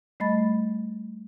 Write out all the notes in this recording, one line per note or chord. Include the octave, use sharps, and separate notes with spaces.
G3 A3 D#5 B5 A6